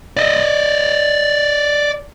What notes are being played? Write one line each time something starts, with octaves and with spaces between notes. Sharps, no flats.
D5 D#5